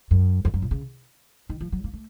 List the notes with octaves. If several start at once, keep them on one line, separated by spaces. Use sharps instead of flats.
F#2
F2
F#2
A#2
C#3
D#3
F3
F#3
A#3
A3